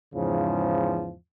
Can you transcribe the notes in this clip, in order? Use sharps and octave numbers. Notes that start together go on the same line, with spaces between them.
E2 G#2 C#3 F3